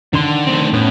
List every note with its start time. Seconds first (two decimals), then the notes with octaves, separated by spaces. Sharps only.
0.13 D3 D#3 D4 C6
0.47 A3 C4
0.73 A2 B3 C#4